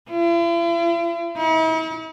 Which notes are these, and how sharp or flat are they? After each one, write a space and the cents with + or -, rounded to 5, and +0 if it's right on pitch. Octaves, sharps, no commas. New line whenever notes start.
E4 +45
E4 -45